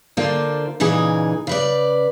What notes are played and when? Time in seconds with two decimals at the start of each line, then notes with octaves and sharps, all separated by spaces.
0.17 D3 A#3 F4 C5 D5
0.80 A#2 C#3 E3 D#4 G#4
1.47 C#3 B4 D5